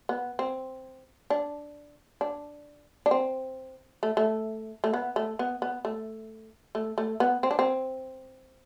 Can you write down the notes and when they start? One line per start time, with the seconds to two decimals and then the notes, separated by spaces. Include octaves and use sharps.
0.09 B3
0.39 C4
1.30 D4
2.21 D4
3.06 D4
3.11 C4
4.03 A3
4.17 A3
4.84 A3
4.94 B3
5.16 A3
5.39 B3
5.62 B3
5.85 A3
6.75 A3
6.98 A3
7.20 B3
7.43 C4
7.51 D4
7.59 C4